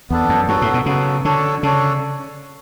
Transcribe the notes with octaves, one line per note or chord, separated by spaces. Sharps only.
E2 B3 D4 A4
F#2
G2 F#3 B3 F#4 A4
A2
B2
C#3 F#3 B3 F#4 A4
D3 D4 A4 C#5
C#3 D4 A4 C#5